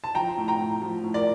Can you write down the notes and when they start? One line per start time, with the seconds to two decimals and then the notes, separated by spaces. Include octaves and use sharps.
0.04 A5
0.15 F3 G5 A#5
0.38 A2
0.48 G5 A#5
0.59 A2
0.82 F3
1.04 A2
1.14 A#4 D5